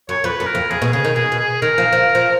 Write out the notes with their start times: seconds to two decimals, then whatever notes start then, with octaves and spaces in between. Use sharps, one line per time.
0.09 F#2 C#5
0.24 F2 B4
0.40 F#2
0.47 A#4
0.55 F2
0.71 F2 G#4
0.82 B2
0.93 C#3 G#4
1.05 D#3
1.16 B2 G#4
1.32 B2
1.39 G#4
1.62 D#3 A#4
1.78 F3
1.92 F3
2.15 F3